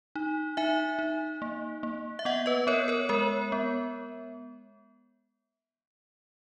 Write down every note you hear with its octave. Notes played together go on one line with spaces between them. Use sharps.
D#4
D#4 E5 G#5
D#4
A#3
A#3
E5
B3 D#5 F#5
B4 D#5
B3 A#4 C#5
A#4 C#5
G#3 A#4 C#5
B3